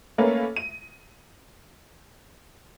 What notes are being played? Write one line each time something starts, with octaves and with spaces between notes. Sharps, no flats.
A3 A#3 C#4 B4 F5
D#7